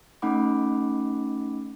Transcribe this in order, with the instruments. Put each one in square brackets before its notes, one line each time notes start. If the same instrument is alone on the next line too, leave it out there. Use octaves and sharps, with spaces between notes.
[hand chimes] A3 C#4 D#4 F#5 B5 D6